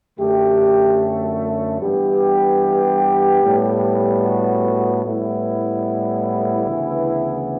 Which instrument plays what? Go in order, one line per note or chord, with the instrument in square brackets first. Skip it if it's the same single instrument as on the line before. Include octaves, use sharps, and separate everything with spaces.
[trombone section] F#2 D3 A3 G4
G2 E3 B3 G4
A2 G3 B3
F#4
A2 G3 B3 E4
D2 C#3 E3 B3